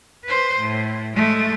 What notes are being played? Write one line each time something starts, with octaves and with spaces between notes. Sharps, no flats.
B4 C5
A2
G#3 A3